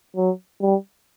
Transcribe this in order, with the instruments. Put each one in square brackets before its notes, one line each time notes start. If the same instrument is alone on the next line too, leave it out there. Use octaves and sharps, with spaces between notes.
[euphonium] F#3
G3